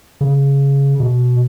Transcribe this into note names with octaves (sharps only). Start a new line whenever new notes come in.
C#3
B2